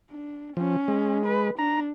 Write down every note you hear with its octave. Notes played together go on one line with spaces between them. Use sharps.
D4
F3 C#4
G#3
B4
D4 A#5